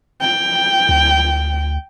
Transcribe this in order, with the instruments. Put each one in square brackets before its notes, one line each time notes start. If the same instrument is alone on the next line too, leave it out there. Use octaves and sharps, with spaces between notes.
[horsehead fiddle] G5
[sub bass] D2